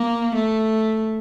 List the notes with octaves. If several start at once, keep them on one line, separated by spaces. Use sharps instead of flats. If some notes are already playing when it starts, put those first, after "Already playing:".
Already playing: A#3
A3